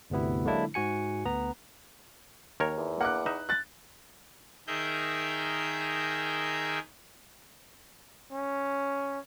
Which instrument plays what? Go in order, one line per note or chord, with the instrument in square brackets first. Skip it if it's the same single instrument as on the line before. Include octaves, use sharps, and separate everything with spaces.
[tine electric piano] G1 D2 C3 B3 E4
D3 F#3 G#3 A#3 D4 E4
G#2 F#4 G#5 C#7
D2 B3 A#5
[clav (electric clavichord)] D#2 A#4 C#5
[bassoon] E2
[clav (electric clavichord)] A#3 [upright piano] F#5 D6 F#6
[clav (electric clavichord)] D#4 B4 E5
[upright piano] F#6 A6
[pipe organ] D#3 G#4 A#4 E5 G6
[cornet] C#4